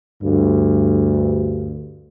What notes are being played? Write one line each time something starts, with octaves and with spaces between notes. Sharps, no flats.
D2 G2